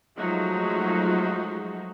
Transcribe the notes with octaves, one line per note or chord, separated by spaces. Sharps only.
F3 F#3 G#3 A3 D#4 F#4